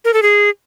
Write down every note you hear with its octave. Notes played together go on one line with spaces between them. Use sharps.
A#4
A4
G#4